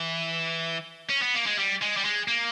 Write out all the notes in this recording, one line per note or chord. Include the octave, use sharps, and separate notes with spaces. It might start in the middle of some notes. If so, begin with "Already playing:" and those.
Already playing: E3
C#4
B3
A#3
G#3
G3
G#3
G3
G#3
A#3